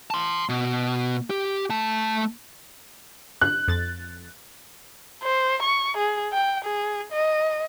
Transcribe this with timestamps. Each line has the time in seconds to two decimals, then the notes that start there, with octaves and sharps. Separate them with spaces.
0.11 A5 C6
0.49 B2
1.30 G4
1.70 A3 A5
3.41 F#6
3.68 F2 A6
5.23 C5
5.63 C#6
5.97 G#4
6.33 G5
6.65 G#4
7.12 D#5